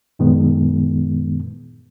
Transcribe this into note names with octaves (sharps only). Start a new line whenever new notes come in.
F#2 A#2 D#3 G#3 B3